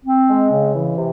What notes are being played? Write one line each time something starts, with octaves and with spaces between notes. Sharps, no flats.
C4
G#3
C#3
E3
C3